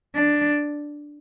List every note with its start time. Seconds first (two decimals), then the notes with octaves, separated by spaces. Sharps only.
0.15 D4